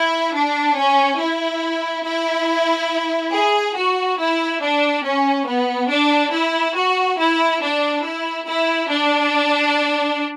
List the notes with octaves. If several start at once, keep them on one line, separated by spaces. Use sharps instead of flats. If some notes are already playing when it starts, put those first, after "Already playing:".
Already playing: E4
D4
C#4
E4
E4
G#4
F#4
E4
D4
C#4
B3
D4
E4
F#4
E4
D4
E4
E4
D4